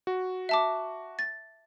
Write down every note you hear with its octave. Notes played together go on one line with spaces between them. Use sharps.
F#4
E5 A5 D6
A6